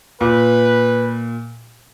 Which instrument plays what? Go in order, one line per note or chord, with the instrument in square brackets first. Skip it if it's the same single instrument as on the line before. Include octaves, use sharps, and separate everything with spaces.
[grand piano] A#2 [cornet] B4